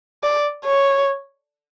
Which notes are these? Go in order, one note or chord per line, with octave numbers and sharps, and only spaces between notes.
D5
C#5